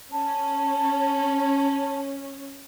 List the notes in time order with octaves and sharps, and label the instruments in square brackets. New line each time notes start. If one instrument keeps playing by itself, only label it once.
[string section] C#4 [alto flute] A5